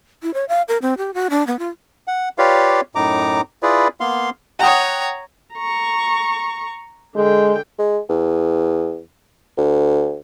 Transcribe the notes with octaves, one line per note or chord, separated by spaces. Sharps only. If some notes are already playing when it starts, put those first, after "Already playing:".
E4
C#5
F5
A#4
C4
G4
F#4
D4
B3
F4
F#5
F4 G4 B4 C#5 D5 F5
F#2 A2 D#4 A#5 D6
E4 F4 G#4 B4 D5
A#3 B3 F5 C6
C#5 F#5 G5 A#5 D#6
A#5 C#6
D3 G#3 G5
G#3
E2
D2